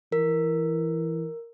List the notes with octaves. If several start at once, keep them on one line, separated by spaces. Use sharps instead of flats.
E3 A#4